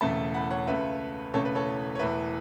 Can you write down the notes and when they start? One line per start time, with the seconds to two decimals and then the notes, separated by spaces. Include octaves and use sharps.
0.01 E1 E2 C#3 A3 E5 A5
0.34 F#5 B5
0.51 C#5 F#5
0.67 C#2 C#3 A3 B4 E5
1.34 E1 E2 C#3 A3 A4 C#5
1.45 B4
1.55 A4 C#5
1.95 C#5
1.99 E1 E2 E3 A3 B4 E5